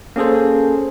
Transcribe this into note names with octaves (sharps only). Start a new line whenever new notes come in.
A#3 C#4 G#4 A4 C5